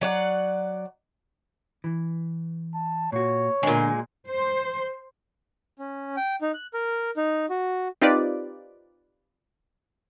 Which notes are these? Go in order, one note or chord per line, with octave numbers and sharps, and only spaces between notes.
F#3 D5 F#5
E3
A5
A#2 F#4 C#5
A#2 D3 G#3 B3
C5
C#4
G5
D#4
F#6
A#4
D#4
F#4
C4 D#4 F4 G4 B4 D5